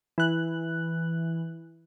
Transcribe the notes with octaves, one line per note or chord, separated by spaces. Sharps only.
E3 F#6